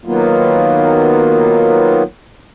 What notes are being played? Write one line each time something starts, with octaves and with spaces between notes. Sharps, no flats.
D#3 F#3 A#3 B3 F4